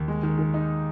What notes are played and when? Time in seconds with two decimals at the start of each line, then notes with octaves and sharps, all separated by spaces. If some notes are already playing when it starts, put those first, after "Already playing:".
Already playing: D#2
0.08 G#3
0.23 D#3
0.39 D#3
0.54 D#4